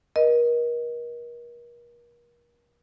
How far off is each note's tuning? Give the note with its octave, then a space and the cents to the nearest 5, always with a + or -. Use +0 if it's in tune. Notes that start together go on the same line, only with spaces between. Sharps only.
A#4 +40 D#5 +0